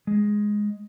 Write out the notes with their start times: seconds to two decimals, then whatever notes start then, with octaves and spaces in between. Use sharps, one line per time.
0.07 G#3